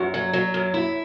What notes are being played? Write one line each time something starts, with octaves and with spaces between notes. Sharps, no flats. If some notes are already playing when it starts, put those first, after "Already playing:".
Already playing: F#2 F#4
F#3
F#3
F#2
E4